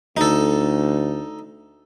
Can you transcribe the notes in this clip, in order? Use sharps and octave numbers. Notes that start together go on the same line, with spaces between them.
D2 D#4 A4